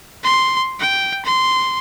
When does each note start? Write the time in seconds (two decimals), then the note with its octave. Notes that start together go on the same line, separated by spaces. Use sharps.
0.24 C6
0.80 G5
1.25 C6